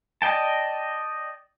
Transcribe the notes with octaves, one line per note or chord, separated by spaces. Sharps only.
D5 D#5 G5 A5